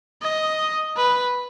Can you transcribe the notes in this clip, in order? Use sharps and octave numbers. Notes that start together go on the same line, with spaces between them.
D#5
B4